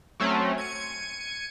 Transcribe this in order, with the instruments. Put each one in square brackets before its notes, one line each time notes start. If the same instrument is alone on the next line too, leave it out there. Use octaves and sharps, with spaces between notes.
[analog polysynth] F#3 A3 C4 C#4
G#6 C#7 D#7